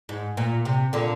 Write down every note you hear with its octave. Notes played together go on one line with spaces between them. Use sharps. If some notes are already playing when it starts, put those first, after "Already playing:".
G#2
A#2
C3
A#2 D3